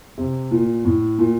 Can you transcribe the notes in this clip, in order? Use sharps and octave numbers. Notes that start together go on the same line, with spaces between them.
C3
A#2
A2
A#2